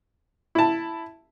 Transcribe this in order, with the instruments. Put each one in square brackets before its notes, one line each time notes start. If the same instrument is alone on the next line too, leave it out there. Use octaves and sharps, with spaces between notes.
[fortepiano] E4 A5